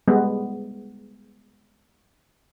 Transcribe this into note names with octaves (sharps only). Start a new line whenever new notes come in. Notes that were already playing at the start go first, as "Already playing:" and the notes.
G3 G#3 B3